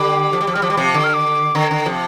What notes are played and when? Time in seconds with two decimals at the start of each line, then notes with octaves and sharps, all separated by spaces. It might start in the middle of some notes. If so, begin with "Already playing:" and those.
Already playing: D3 G3 D6
0.33 F3
0.41 G3
0.47 F3
0.54 G3 F6
0.62 F3 D6
0.70 G3
0.77 C3 F3
0.94 D3 D6
1.04 F6
1.14 D6
1.55 D3 A#5
1.71 D3
1.86 C3 F3